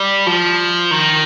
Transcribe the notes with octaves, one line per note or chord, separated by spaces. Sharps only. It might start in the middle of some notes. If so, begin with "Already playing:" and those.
Already playing: G3
F3
D#3